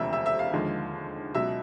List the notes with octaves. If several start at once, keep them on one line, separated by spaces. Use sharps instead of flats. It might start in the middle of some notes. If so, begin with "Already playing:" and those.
Already playing: E1 D2 C3 F3 E5
E5
E5
F5
D#2 D3 F3 G#3
C#2 B2 F#3 E5